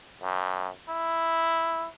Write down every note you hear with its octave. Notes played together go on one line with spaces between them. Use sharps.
F#2
E4